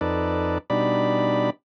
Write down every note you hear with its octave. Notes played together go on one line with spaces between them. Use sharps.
F2 D#4 A4 B4 D5
B2 G3 D4 D#4 D5 B5